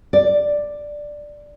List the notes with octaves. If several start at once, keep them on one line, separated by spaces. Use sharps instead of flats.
D5